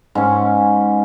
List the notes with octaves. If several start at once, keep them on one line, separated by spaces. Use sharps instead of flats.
G#2 C#4